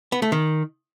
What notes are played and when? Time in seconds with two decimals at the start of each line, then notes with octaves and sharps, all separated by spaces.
0.12 B3
0.22 A3
0.32 D#3